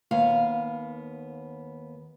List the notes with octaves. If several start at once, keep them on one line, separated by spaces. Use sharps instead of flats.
D#2 B3 F5